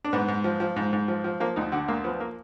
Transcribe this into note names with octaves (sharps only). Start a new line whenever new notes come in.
D4
G#2 B3
G#2
F3
F3
G#2
G#2
F3
F3
F3 A#3
D2 D#4
D3 F#4
D2 A#3
F3 B3
A#3